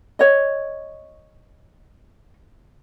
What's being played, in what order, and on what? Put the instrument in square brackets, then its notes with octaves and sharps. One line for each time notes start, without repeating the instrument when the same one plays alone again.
[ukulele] C#5 D#5